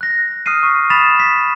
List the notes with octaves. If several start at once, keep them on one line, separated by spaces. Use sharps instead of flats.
F#6 A#6
D#6 F6 F#6 C7 D#7
C#6 B6
B5 D#6 A6 B6 E7 F7
A6 B6